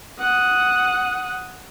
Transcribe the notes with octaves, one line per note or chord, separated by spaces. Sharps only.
F#5 D#6